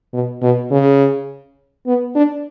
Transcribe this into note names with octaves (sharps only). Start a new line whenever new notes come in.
B2
B2
C#3
B3
D4